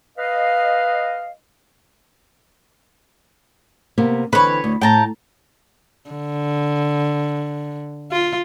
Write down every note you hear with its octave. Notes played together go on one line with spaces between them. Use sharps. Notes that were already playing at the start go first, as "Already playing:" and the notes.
B4 D#5 F5
C3 A#3 B3
D3 E3 C4 B4 C#5
D2
A2 G5 A5 A#5
D3
F4